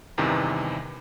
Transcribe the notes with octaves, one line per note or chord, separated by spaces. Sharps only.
E2 G2 C3 D#3 E3